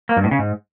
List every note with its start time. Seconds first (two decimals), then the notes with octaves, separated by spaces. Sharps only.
0.09 A#3
0.17 G2
0.24 A2
0.31 C#3
0.39 G#2